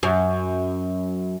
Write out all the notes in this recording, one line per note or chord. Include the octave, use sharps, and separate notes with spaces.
F#2